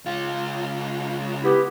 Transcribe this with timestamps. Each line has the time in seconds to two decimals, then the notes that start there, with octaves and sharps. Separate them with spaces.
0.06 C#2 F4
1.43 B3 E4 G4